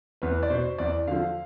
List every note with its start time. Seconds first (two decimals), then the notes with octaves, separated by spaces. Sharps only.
0.22 E2 B4
0.43 D5
0.50 B2 C5
0.78 E2 D5
1.07 D3 F3 F5